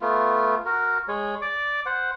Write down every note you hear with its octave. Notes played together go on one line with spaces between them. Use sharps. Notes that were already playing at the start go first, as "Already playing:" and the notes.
A3 B3 F4
F#4 A#4
G#3 C#5
D5 D6
C5 F#5